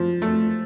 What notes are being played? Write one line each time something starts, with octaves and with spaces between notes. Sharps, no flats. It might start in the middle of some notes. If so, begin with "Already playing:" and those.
Already playing: F3
A3